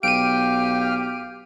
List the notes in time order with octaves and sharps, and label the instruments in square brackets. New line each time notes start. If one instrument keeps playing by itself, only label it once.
[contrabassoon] B1 [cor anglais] G4 [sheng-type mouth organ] F5 G5 F6 [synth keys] D7 D#7